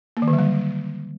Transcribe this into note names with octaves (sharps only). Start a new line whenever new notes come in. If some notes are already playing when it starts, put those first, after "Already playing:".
A#3
D#3
D3
F#3
G3